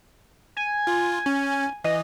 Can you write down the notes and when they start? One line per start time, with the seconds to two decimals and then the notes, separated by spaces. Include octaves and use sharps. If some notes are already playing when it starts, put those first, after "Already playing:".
0.57 G#5
0.87 F4
1.26 C#4
1.84 E3 D#5